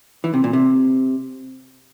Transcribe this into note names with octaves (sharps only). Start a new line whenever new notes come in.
E3
C3
A#2
C3